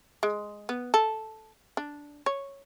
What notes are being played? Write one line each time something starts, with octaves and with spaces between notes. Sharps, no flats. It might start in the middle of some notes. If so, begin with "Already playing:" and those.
G#3
B3
A4
D4
C#5